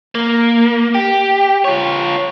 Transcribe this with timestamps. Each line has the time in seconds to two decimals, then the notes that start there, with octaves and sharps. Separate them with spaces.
0.15 A#3
0.95 G4
1.65 F4 C#5